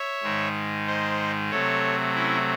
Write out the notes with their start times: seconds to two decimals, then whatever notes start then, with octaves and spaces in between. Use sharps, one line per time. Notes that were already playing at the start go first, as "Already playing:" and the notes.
Already playing: C#5 E5
0.23 G#2 D#3 G#3
0.87 C5 D#5
1.51 C3 F#3 A3 A4 C#5
2.15 C#4 E4